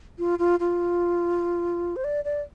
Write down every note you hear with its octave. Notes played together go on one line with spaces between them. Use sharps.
F4
F4
F4
C5
D5
D5